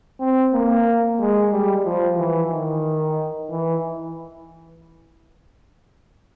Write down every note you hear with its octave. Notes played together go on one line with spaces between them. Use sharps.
C4
A#3
G#3
G3
F3
E3
D#3
E3